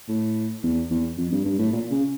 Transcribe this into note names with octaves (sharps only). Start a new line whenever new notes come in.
A2
E2
E2
F2
G2
G2
A2
A#2
C#3